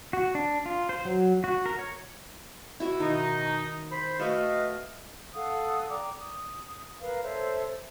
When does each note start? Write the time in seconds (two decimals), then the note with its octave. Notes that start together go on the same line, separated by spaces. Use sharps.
0.13 F#4
0.35 D4
0.66 F4
0.89 C5
1.05 F#3
1.44 F#4
1.66 A#4
1.79 C#5
2.80 E4 F#4 E5
3.00 B2 D#3 D#4
3.91 C5 B5
4.19 A3 F#4 A4 B4 D#5 F5
5.34 A4 F5 F#5 D#6
5.89 D5 G5 A#5 D6
6.19 D#6
7.01 A#4 B4 F5
7.23 A4 C5 C#5 E5